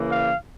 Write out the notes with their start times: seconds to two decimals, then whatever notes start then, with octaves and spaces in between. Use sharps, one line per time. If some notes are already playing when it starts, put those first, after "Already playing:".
Already playing: C#3 E3 A#3
0.09 F5